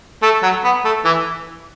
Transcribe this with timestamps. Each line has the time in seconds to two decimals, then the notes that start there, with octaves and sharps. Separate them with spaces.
0.23 A3
0.43 F#3
0.64 B3
0.85 A3
1.05 E3